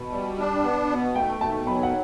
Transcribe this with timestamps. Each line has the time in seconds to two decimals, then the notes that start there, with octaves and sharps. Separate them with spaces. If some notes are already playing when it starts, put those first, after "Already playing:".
Already playing: B2 B5
0.11 G3
0.38 D4
0.63 B3
0.90 B2
1.15 A3 G5
1.41 B2 A5
1.67 F#3 B5
1.83 F#5